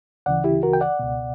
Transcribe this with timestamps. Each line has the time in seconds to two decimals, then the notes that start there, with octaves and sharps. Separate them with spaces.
0.26 D2 C#3 E3 D5 F#5
0.44 E4 G4
0.63 F#4 A#4
0.73 G5
0.81 D5 F#5
0.99 C#2 B2